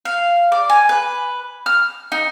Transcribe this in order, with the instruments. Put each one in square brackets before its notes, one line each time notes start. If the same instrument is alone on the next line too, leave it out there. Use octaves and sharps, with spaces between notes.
[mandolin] F5
D5
G#5
B4
F6
D#4